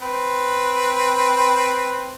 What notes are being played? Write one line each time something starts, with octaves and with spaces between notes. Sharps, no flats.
C4 B4